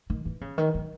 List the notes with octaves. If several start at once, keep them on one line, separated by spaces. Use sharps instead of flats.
D#3
E3
C#3
D#3
F#3